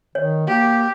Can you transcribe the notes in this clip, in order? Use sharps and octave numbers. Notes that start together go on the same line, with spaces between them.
D#3 C#5
A#3 G4